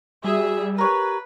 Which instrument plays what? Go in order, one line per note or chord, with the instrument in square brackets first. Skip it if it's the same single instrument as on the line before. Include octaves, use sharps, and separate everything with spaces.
[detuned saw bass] G3 [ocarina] F#4 [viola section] G#4 E5
[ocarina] G4 [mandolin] A#4 C#5 [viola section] B4